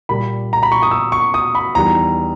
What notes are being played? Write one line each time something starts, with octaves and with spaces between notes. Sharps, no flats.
A#2 G3 A#3 B5
A#5
B5
C#6
D#6
E6
C#6
D#6
B5
E2 D#3 G3 A#5